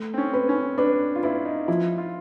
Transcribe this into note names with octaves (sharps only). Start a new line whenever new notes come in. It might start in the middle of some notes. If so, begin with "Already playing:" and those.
Already playing: A3
C4
C#4
B4
C#4
D4 B4
F4
E4 B4
D#4
F3 E4
F4